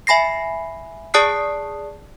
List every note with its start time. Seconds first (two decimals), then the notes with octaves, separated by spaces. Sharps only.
0.07 E5 G#5 B5 A#6 C7
1.14 G#4 D5 A5 D#6 F#6 C7